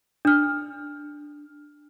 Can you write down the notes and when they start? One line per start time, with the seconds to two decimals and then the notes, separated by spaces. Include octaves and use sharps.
0.25 D4 F6